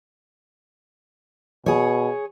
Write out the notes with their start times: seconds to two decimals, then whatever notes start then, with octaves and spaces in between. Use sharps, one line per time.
1.66 B2 G#4 C#5